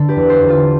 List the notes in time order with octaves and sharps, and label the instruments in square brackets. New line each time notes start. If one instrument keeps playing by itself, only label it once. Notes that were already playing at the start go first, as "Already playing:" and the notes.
Already playing: [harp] D3 A4
G4 B4
E2
A4 C5
E2
F4 A4